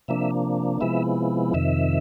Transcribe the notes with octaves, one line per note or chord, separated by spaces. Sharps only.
C3 F3 A#3 D4 E5
C3 F3 G#3 B3 E4 E5
F2 C3 D#3 E5